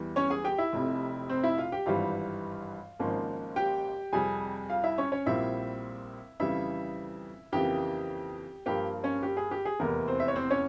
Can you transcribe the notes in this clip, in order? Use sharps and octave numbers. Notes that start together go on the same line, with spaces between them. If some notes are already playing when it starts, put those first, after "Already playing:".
Already playing: E2 E3 G3
C#4 C#5
G#4 G#5
G4 G5
E4 E5
F1 F2 C3
C4 C5
E4 E5
F4 F5
G4 G5
G#1 G2 E3 G3 F4 F5
G#1 G#2 F3 A#3 C#4
G4 G5
F2 C3 G3 G#4 G#5
F4 F5
E4 E5
C#4 C#5
C#4 C#5
A#1 A#2 G3 C4 E4 F4 E5
F2 C#3 E3 G3 E4 E5
F2 C#3 E3 A#3 G4 G5
G2 F3 A#3 G4 G5
C#4 C#5
G4
G#4
G4
G#4
F1 E2 E3 A#3 A#4
C4 C5
E5
C#5
C4 C5
C#4 C#5